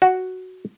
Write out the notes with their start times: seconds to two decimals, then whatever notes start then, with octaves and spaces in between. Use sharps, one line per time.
0.02 F#4